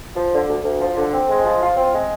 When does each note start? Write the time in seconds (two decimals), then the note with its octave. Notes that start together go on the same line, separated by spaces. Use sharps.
0.16 F3
0.33 D3
0.49 D2
0.64 D2
0.81 F3
0.96 D3
1.13 C4
1.29 G#3
1.45 F3
1.61 F4
1.77 C4
1.94 G#3